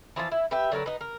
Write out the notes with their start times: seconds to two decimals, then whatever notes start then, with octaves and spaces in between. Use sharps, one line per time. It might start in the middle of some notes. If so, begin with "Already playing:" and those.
0.16 E3 F3 F4 A5
0.31 E4
0.51 G4 B4 E5 G5
0.72 D3 F#3 A#4 B4
0.86 B3 D#4
1.01 A#4